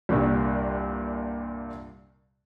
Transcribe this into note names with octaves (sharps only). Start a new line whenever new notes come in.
C2 G2 A#2